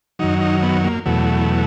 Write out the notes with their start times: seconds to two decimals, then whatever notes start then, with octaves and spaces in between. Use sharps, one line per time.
0.19 F#2 D#3 F#3 D#4
0.41 D#4
0.63 B3
0.84 A#3
1.06 E2 B2 F#3 A3